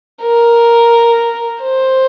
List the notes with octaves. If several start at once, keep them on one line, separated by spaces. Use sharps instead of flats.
A#4
C5